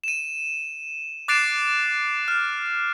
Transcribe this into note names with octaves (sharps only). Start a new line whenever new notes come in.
D#7 E7
D6 F#6 A6 C7 D7 E7
F6